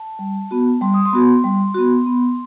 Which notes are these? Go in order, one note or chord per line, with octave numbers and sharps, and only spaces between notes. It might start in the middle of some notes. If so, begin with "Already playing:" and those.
Already playing: A5
G3
B3 F#4
G3 C6
D#6
C6
B3 F#4
G3
B3 F#4
B3